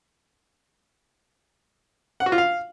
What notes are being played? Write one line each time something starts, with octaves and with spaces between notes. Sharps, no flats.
F#5
F#4
F4
F5